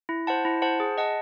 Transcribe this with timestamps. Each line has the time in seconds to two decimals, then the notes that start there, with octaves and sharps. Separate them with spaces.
0.09 E4
0.27 C5 F#5 A5
0.45 E4
0.62 C5 F#5 A5
0.80 G#4
0.98 D#5 F#5 A5